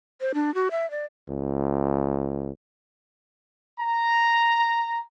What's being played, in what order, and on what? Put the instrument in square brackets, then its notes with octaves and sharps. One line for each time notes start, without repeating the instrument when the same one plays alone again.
[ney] C5
D4
F#4
E5
D5
[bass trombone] C#2
[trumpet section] A#5